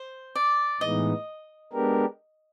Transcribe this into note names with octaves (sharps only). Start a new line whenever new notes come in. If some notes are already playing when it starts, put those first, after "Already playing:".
Already playing: C5
D5
A2 E3 G#3 B3 D#4 D#5
G#3 B3 D4 G4 A#4